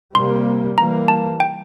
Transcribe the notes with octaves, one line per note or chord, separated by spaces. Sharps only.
C3 G3 A#3 C6
E3 G3 A#3 A#5
A5
G5